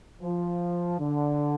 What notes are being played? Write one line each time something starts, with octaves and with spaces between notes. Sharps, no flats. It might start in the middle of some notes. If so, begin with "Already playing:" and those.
F3
D3